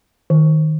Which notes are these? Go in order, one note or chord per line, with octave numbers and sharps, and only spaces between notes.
D#3